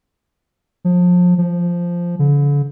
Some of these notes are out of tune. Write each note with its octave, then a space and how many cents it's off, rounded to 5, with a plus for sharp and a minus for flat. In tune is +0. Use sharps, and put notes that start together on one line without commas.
F3 +30
F3 -5
D3 -40